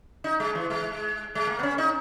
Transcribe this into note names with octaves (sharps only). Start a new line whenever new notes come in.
D#4
G#3
E3
G#3
G#3
A#3
B3
C#4
D#4